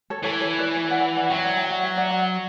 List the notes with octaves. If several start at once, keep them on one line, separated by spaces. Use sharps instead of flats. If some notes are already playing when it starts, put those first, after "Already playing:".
A4 C#5
E3 A4 C#5
A4 C#5
B4 D5
C#5 E5
D5 F#5
D5 F#5
F#3 E5 G5
D5 F#5
E5 G5
D5 F#5
C#5 E5
D5 F#5
D5 F#5